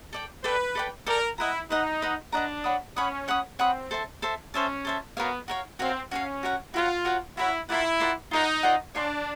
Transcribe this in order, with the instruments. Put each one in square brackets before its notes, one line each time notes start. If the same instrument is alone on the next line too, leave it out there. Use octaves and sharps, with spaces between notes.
[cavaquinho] A4 D5 G5
[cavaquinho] A4 D5 G5 [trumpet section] B4
[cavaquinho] A4 D5 G5
[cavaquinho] A4 D5 G5 [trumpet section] A#4
[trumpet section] E4 [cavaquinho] B4 D#5 F#5 A#5
[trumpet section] D#4 [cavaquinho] B4 D#5 F#5 A#5
[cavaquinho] B4 D#5 F#5 A#5
[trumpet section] D4 [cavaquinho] B4 D#5 F#5 A#5
[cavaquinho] C#5 F#5 B5 D#6
[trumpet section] C#4 [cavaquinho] C#5 F#5 B5 D#6
[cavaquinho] C#5 F#5 B5 D#6
[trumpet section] C4 [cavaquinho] C#5 F#5 B5 D#6
[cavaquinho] A4 C5 E5 A5
A4 C5 E5 A5
[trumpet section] C#4 [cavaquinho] A4 C5 E5 A5
[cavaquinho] A4 C5 E5 A5
[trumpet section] B3 [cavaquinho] F#4 A#4 C#5 F5
[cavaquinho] F#4 A#4 C#5 F5
[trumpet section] C4 [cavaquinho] F#4 A#4 C#5 F5
[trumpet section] C#4 [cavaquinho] F#4 A#4 C#5 F5
[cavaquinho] F#4 A#4 C#5 F#5
[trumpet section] F4 [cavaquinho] F#4 A#4 C#5 F#5
[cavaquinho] F#4 A#4 C#5 F#5
[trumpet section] E4 [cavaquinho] F#4 A#4 C#5 F#5
[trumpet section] E4 [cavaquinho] F4 A#4 D5 F#5
[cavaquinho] F4 A#4 D5 F#5
[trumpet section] D#4 [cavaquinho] F4 A#4 D5 F#5
[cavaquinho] F4 A#4 D5 F#5
[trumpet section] D4 [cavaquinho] C#5 F5 G#5 C6